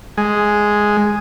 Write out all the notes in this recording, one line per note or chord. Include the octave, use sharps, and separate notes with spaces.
G#3